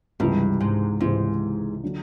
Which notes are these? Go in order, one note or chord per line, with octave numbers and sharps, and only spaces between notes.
C#2 G2 C3 E3 G#3
G#2
C#2 G#2 C3 E3 G#3
D3 F#3